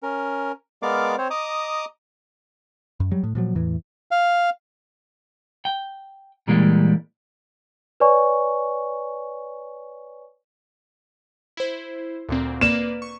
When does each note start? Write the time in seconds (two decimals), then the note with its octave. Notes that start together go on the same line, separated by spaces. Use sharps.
0.03 C#4 A#4
0.82 G#3 B3 A#4 D5 F5 D6
1.18 C4 C5 C#5
1.30 D#5 A#5 D6 D#6
3.00 F#2
3.11 F#3 G3
3.24 A2
3.35 A#2 F3 F#3
3.55 E2 A2 E3
4.11 F5
5.65 G5
6.47 A#2 E3 G3 G#3 A#3
8.00 B4 C#5 D5 G#5 C#6
11.57 E4 C5
12.29 D2 A#2 C4
12.61 A#3 B4 D5 E7
13.02 C#6